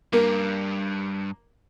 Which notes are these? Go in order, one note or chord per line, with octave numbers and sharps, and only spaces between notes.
G2 A#3